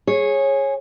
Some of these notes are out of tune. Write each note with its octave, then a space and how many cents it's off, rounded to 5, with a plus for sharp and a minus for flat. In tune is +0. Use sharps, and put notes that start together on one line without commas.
G#4 +0 C#5 -15